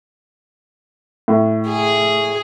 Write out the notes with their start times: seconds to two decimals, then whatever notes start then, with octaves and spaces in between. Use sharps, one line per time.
1.28 A2
1.68 G#4